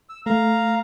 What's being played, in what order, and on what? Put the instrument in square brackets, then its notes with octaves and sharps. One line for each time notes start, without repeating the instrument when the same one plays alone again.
[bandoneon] E6
[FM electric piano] A3 [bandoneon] F5 A#5